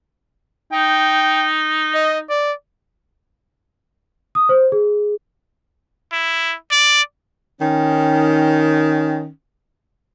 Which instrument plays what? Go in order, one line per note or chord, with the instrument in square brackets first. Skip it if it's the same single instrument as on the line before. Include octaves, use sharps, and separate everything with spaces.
[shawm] D#4 [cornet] G5
[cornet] D#5
D5
[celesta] D#6
C5
G#4
[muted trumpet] E4
D5
[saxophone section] D#3 C#4